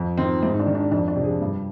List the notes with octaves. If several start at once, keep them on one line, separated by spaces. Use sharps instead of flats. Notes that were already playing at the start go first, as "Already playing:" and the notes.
Already playing: F2
D#3 C4
G#2 C4
D#4
D4
D#3
D4
F2 D4
D4
C3
F3 G#4
G2